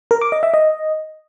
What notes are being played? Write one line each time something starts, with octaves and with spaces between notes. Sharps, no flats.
A#4
D6
D#5
E5
D#5